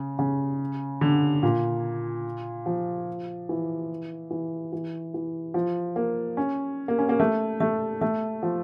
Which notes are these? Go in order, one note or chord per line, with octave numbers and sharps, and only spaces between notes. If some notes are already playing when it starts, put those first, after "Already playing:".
Already playing: C#3
C#3
D3
A#2
F3
E3
E3
E3
E3
F3
A#3
C#4
A#3
C#4
A#3
A3
A3
A3
F3